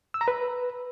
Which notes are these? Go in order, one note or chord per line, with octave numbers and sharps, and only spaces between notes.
E6
A#5
B4